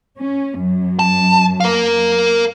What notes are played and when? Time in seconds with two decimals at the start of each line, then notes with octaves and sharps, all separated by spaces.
0.16 C#4
0.59 F#2
0.99 A5
1.60 A#4 F5